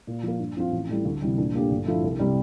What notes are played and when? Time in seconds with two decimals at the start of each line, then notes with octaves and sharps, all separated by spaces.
0.07 A#2
0.23 F3 A#3
0.39 G2
0.56 F3 C4 F4
0.72 A1
0.89 A2 E3 G3
1.05 D2
1.22 C3 E3 G3
1.38 A#1
1.54 A#2 A3 D4 G4
1.71 G1
1.87 G2 F3 A3 E4
2.04 C2
2.19 C3 G3